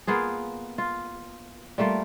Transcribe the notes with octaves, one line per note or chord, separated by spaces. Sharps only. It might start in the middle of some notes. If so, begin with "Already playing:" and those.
A#3 B3 F4 G#4
F4
G3 A3 A#3 F4